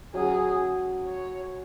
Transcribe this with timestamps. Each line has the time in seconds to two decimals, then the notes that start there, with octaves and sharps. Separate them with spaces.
0.14 F#3 C#4 F#4 G#4
1.07 C#5